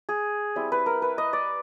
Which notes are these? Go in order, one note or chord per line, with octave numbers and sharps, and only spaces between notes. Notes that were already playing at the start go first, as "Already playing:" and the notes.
G#4
G3 C4 E4
B4
A#4
B4
D#5
D5